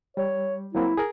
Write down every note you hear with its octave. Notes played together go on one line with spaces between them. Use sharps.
G3 C#5
F#3 A#3 C4 E4
G#4 A#4